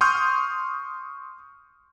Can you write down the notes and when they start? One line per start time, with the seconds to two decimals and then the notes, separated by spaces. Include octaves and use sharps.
0.01 C6 C#6 D#6 F6 G6